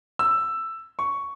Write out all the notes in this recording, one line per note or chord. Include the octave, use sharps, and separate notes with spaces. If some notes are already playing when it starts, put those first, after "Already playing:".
E6
C#6